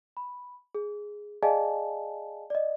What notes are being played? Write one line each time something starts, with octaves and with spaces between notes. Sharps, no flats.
B5
G#4
G#4 D5 D#5 F5 G#5 A5
D5 D#5